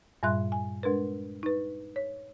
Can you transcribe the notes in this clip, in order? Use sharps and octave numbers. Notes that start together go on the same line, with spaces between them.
G2 A#2 G3 E5 C6 F#6
G#5
G#3 D4 A#4 B4
D#4 B4
C#5